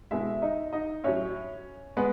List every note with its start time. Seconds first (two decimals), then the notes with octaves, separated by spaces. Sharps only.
0.11 B2 G#3 E4 E5
0.42 D#4 D#5
0.73 D#4 D#5
1.04 A2 F#3 C#4 C#5
1.97 G#3 B3 B4